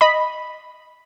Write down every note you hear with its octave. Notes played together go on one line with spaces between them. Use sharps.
D#5 B5